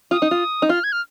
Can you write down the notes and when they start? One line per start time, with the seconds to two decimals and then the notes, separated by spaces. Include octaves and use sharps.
0.11 F4 D#6
0.22 D#4
0.31 F4
0.62 D#4
0.69 F4 F6
0.84 G#6
0.92 F6